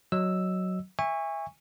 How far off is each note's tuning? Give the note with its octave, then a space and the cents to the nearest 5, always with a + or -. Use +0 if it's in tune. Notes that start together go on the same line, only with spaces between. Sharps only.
F#3 +0 D#5 +0 E6 +0
E5 +0 G#5 -30 C#6 +0